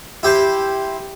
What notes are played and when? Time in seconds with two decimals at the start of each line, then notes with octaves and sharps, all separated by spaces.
0.23 E4 G4 C5